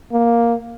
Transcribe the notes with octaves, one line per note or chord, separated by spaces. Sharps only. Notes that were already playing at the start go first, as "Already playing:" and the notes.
A#3